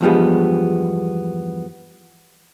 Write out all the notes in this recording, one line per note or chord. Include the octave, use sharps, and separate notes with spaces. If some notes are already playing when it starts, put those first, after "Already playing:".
E2 G2 F3 G3 G#3 B3